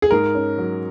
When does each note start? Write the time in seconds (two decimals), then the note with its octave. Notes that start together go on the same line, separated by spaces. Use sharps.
0.02 G#4
0.11 G#2 A#4
0.35 C#4
0.58 F#3